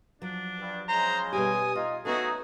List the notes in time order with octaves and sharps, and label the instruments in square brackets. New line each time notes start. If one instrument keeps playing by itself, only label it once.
[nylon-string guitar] F3 F#3 [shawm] D4
[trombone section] G2
[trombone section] C#3 G#3 [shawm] C5 [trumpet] A#5
[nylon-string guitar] B2 G3 G4 [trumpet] G#5 [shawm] D#6
[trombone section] D#4 [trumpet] F4 [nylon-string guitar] D#5
[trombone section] A3 D#4 [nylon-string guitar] B3 C#4 A4 [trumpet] F#4 [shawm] G#4